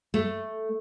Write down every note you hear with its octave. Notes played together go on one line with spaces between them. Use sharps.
A3